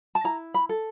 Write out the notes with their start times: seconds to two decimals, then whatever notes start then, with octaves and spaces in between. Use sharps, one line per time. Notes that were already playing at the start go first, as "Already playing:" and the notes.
0.15 A5
0.24 E4 A#5
0.54 B5
0.69 A4